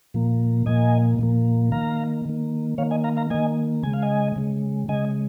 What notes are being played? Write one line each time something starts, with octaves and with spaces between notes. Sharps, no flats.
A#2 F3 A#3
A#2 F3 A#3 D#5 G#5
A#2 F3 A#3
D#3 A#3 F5 A#5
D#3 A#3
D#3 A#3 C#5 F5
D#5 G#5
F5 A#5
F5 A#5
D#3 A#3 D#5 G#5
C#3 G#3 G#5
F5
D#5 G#5
C#3 G#3
C#3 G#3 D#5 G#5